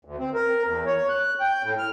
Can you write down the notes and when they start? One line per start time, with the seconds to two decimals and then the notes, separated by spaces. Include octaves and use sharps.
0.05 D2
0.19 C4
0.34 A#4
0.66 E2
0.86 C#5
1.09 F#6
1.40 G5
1.63 A2
1.78 F6